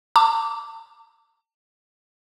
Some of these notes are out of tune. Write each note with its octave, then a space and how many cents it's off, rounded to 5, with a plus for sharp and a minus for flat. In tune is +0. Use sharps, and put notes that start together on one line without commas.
A5 +40 D6 -15